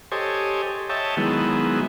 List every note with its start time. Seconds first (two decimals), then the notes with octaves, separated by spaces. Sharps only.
0.12 G4 A4 C5 C#5 D#5 G#5
0.90 C#5 D#5 E5 G5 A5
1.17 D#3 F#3 G#3 B3 E4